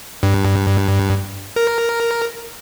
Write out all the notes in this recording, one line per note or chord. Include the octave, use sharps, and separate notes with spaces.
G2
A#4